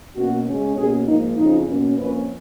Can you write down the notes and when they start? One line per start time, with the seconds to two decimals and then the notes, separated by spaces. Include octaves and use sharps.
0.15 B2 A#3 C#4 F#4
0.45 C#3 G#3 C#4
0.75 B2 A#3 C#4 G#4
1.06 G#2 F3 A#3 D#4
1.36 F2 C#3 F3 D#4
1.66 B2 A#3 C#4
1.96 F2 F3 A#3 C#4 B4